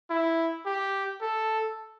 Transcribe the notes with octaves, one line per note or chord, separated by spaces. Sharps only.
E4
G4
A4